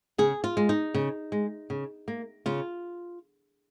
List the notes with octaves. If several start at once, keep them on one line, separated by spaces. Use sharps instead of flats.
C#3 G#4
F4
G#3
D#4
C#3
G#3
C#3
A#3
C#3 F4